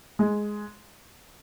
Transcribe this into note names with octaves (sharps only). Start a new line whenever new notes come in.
G#3